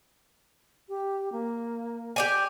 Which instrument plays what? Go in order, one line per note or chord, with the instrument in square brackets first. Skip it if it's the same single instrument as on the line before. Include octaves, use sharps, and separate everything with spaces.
[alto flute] G4
A#3
[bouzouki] G4 D5 G#5